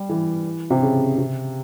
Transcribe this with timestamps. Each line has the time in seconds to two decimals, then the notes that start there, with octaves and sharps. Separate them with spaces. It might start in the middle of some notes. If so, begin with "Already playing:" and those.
Already playing: G3
0.09 E3
0.70 C3
0.82 C#3
1.18 C3